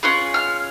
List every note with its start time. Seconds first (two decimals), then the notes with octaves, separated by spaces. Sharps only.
0.03 C#4 F4 G#4 F#6
0.34 F6